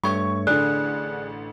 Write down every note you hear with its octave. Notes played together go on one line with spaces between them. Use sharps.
G2 A3 C#5 C#6
A1 D3 G#4 D5 F#6